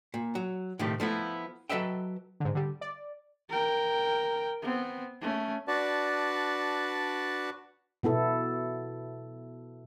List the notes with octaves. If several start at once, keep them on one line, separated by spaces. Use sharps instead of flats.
A#2
F#3
A2 C3 D#3 F3 A3 G4
F3 A3 B3 E4
F#3 A4 B4 D#5 E5 G5
G#2 D3
D3 G3
D5
A#4 G5
B3 C4
A3 C#4
D4 F#4 B4 D5 A5
B2 B3 E4 A4